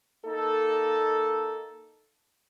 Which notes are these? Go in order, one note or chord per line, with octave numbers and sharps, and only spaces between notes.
A#3 D#4 A4